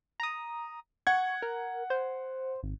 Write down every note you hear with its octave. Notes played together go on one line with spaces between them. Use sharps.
A#5 D#6
F#5 C#6 G#6
A#4
C5
G#1